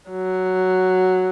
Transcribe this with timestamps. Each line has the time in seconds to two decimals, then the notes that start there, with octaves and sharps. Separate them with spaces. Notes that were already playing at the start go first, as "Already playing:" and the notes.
0.11 F#3